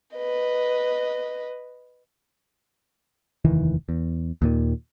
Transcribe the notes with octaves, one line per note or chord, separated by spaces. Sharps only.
B4 D#5
F1 D#2 D#3 E3
E2
D#2 A#2 D#3